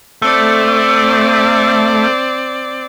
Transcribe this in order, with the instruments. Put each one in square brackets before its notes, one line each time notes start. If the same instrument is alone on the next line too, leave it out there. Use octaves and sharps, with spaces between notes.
[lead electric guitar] A3 [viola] C4 D5